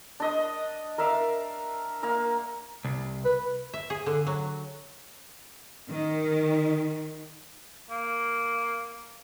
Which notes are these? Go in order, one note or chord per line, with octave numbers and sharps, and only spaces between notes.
D4 D#5 D#6
A#4 D5 E5 F5
A#3 A#4 F5
C2
B4
E5
G#4
D3
F#3
D#3
A#3